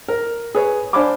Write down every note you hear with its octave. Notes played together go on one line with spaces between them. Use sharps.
A#4
G#4 B4 C#5
D4 C5 F5 G#5 B5 D6